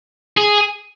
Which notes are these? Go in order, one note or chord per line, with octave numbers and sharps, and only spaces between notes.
G#4